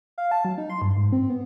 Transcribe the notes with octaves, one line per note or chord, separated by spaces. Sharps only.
F5
A5
F#3
D#4
C6
G2
G#2
C4
B3